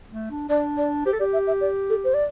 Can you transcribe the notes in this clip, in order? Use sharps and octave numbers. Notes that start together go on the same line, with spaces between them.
A3
D4
D4 D5
D5
G4 C5
A4
G4 D5
E5
E5
D5
A4
C5
D5